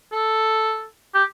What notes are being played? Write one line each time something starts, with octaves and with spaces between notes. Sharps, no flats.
A4
G4